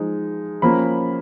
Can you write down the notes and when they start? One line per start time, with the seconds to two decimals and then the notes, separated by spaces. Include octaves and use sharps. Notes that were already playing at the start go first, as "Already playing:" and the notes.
Already playing: F3 G#3 D#4
0.62 F3 A#3 C#4 B5